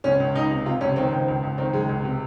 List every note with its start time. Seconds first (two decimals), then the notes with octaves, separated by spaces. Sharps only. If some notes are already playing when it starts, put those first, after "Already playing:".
0.04 C#2 C#4
0.20 C#2
0.35 C#2 D#4
0.51 C3
0.66 C3 F4
0.81 C#2 C#4
0.96 D#3 C4
1.12 C#2
1.28 C#2
1.43 C#2
1.58 D#3 C4
1.73 C#2 G#3
1.89 C#2
2.04 C3